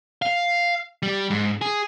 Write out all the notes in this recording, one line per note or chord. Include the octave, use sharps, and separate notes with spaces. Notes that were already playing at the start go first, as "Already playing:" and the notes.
F5
G3
G#2
G#4